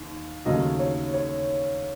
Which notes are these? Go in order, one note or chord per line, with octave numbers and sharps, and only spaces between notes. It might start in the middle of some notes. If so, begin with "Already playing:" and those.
Already playing: D#2
D#2 C#3 F#3 A3 D#5
C#5
C#5